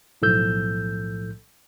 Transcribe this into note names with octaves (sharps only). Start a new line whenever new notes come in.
B1 A2 F3 A4 E6 G6